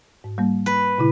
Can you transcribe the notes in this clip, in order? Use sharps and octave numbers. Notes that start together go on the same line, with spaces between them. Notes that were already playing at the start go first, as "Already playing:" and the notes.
G#2
G3 A#3
B4
A#2 C#3 E4